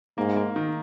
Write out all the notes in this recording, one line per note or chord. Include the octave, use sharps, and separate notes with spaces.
G#2 A#3
A#3
D#3